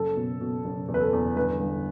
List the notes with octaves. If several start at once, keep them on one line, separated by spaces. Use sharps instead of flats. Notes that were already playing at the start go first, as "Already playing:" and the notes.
Already playing: F#1 A4
B2
B2
F#1
E2
B4
A4
E2
G1 B4
G1